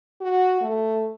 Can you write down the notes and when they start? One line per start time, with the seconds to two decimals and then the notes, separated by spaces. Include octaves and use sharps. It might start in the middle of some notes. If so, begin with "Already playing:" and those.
0.21 F#4
0.62 A3